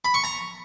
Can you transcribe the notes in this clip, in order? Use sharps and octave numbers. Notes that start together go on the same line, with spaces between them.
B5
C#6
A#5